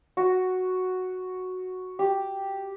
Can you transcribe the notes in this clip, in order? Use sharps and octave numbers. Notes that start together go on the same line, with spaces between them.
F#4
G4